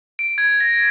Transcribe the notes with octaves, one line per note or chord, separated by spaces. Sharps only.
D7
G#6
A#6